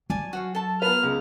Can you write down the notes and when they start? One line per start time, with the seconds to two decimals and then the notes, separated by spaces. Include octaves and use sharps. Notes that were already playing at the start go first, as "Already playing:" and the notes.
0.10 F#3 D5 G#5 A5
0.33 F#4 C#5 F5
0.55 A4 A5
0.82 B3 F4 B4 A#5 F6
1.03 C#2